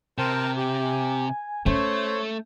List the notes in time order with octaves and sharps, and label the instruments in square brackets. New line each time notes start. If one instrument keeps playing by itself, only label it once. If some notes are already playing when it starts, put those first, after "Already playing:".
[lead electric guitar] C3 [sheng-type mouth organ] A#4 G5 A5 [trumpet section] C5
[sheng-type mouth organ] G4 [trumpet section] G#5
[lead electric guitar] A3 [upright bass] C#4 [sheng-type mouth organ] C5 [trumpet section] C#5